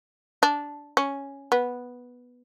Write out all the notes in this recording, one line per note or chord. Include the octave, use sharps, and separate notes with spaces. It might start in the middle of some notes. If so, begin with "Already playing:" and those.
D4
C#4
B3